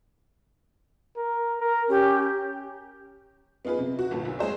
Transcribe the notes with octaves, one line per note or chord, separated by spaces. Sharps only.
A#4
A#4
C#4 G4
B3 D#4 F4 G#4 B4
C3
F#4
G1 A#2 A5
B1
G#3 G#4 C5 C#5